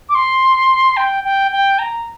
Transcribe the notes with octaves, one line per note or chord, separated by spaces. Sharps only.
D6
C6
G5
G5
G5
A#5